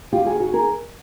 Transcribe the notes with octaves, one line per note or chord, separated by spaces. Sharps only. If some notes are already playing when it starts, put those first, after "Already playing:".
D#2 D#3 F4 G4
F#4 G#4
F#4 G#4
G#4 A#4